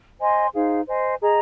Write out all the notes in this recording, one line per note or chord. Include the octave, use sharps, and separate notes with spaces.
C5 D#5 G#5 C6
D#4 G#4 C5 F5
C5 D#5 G#5
G#4 D#5 A#5